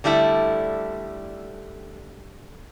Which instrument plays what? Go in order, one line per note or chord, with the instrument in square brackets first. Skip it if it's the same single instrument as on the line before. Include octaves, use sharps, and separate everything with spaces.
[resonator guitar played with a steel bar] D3 G3 A3 E4